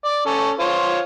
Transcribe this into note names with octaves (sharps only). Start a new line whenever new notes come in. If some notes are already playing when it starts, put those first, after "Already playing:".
D5
C#4 A4
F4 C5 C#5